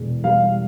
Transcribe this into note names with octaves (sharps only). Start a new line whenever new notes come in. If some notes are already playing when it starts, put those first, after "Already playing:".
Already playing: E1
G3 F5